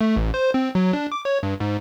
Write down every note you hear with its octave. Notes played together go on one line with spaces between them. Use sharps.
A3
A1
C5
C4
F#3
D4
D6
C#5
G2
G#2